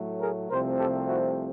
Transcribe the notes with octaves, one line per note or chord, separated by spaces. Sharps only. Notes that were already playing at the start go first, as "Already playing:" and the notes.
Already playing: A2 F#3 A3
G#4 A#4
C2 C3 F3 A3 C4 A#4 C5
G4 A4
E4 F#4